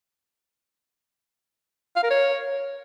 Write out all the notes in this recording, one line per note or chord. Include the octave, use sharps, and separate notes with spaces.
F5
A#4
C#5